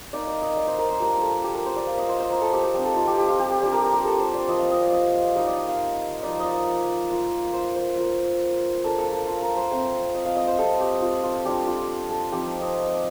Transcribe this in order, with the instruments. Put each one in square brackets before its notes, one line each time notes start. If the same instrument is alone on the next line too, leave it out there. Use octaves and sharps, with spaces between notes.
[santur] A#3 D#4 D5
D5
D#5
D5
C5
A#4
C5
G3 D4 F4 A#4
A4
G4
A#4
C5
D5
A#3 F4 F5
D#5
C5
C5
A#4
A4
G4
G4
G3 C4 D#4 G4
A4
F4
G4
G4
F4
G4
G4
G3 D4 F4 G4
A#4
A#4
A#4
A4
C5
D5
F3 A#3 F4 D#5
F5
D#5
D5
D#5
F5
G3 A#3 D#4 D#5
D5
D#5
F5
F3 A#3 D#4 D5
D5 D#5
A#3 F4
C5
C5
A#3 F4
A#3 D4 F4 A4
A4
A4
F4
A#4
C5
A3 C4 F4
D#5
F5
D#5
C5
G3 C4 F4 A4
G4
F4
F4
G3 D4 F4 G4
F4
A4
F3 C4 D#4 G4
D#5